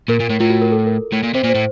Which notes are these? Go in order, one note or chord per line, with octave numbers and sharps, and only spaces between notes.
A#2 A#4
A#2
A2
A2 F4
F#4
A#4
A4
A#4
A2
A#2
C3 C5
A#2
C5
A2